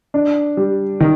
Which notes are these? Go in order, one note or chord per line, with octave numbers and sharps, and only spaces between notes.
D4
G3
D#3